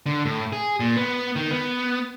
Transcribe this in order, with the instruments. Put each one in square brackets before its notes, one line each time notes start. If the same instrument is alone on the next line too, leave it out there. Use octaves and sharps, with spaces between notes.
[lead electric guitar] D3
A2
G#4
A#2
B3
D#3
B3